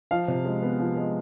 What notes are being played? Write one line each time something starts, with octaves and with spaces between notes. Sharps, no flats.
F3 F5
C3
G#3
B3
F3
G#3